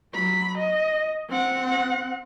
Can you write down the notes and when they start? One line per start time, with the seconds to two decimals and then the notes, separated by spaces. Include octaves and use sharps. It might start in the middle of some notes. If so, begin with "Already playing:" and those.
0.14 F#3 B5
0.58 D#5
1.29 C4 F#5